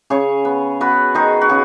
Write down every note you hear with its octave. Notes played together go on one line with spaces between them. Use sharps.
C#3 G#4 C#5
B3
B3 F#4 B4
D#3 D#4 G#4
F#4
C#3 G#4